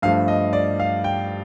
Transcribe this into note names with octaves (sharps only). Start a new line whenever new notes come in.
G2 F3 A3 F5
D#5
D5
F5
G5